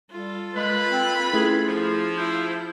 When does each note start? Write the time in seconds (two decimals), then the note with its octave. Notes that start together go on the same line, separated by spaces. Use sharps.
0.11 G3 F4 A4
0.55 G#3 A#3 B4 B5
0.89 C4
1.33 A3 C#4 E4 G#4
1.68 F3
2.18 E4 G6